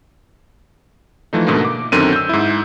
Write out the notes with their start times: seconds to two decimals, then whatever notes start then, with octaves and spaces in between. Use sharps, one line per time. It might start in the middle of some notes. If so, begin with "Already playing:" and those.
1.33 E3 F3 A3 D#4
1.47 G#2 B2 D3 A3 A#3
1.65 D6
1.92 F#2 D3 D#3 C4 D#7
2.13 E6 G6
2.29 G#2 E4